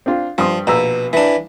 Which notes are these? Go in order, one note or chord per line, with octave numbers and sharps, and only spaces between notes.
C4 D4 F4
G2 F3 C6 D#6
A#1 B2 A#5 E6
E3 D4